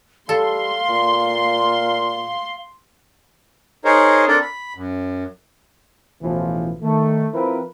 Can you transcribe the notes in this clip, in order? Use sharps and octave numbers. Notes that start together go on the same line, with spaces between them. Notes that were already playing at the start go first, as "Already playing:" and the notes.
G3 A4 F5 C6
A#2
D#4 G#4 A#4 C5 C#5
C4 D4 A4 A#4 D5
B5
F#2
A1 B2 E3 F3
D#3 A3
F3 C4 E4 A#4 B4